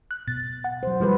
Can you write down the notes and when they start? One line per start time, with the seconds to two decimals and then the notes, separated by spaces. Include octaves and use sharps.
0.11 F#6
0.28 B2 A6
0.64 F#5
0.83 F#3 C5
1.00 D#3 F3 G3 F4 G#4 B4